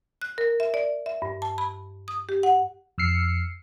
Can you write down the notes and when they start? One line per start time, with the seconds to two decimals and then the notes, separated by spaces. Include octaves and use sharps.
0.22 F#6
0.38 A#4
0.60 E5
0.74 D5
1.06 E5
1.22 G2
1.42 A5
1.58 B5
2.08 D#6
2.29 G4
2.43 F#5
2.98 F2 E6 F6 C7 C#7